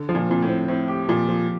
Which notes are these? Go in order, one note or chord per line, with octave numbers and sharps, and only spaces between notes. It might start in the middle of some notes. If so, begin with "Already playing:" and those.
Already playing: D3
F3
A#2
A#2 C4
A2
C4
A2 C4
G4
A#2 F3
F3